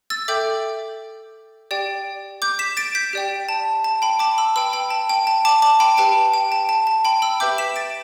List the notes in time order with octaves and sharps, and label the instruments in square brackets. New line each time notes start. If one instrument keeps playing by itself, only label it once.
[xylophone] E6 A6
A4 E5 G5 D6 G6
G4 D5 G5
D6 G6
B6 E7
A6 D7
G6 B6
G4 D5 G5
A5
A5
G5 B5
A5 D6
B5 E6
B4 G5 B5 E6
G5 B5
A5
G5
A5
A5 D6
A5 D6
G5 B5
G4 B4 G5 A5
G5
A5
A5
A5
G5 B5
B5 E6
G4 B4 E5 G5 D6 G6
B6 E7
A6 D7